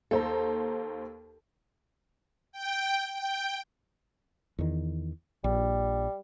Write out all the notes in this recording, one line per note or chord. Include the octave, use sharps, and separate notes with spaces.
D#2 A4 C5 A#5
G5
G5
E2 D#3
A#1 G3